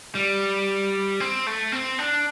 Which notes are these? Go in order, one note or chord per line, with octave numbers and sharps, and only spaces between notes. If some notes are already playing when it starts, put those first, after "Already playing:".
G3
C4
A3
C4
D4